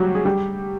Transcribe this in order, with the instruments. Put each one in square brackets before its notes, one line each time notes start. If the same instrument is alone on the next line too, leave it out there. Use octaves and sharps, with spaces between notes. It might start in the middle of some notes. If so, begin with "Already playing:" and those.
Already playing: [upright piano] F#3 G3 F#4 G4
G#4
G3 G4